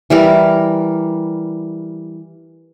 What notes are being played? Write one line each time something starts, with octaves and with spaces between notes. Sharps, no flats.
E3 G3 A#4